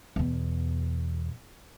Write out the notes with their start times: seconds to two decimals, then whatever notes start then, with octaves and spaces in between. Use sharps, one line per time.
0.16 E2 B2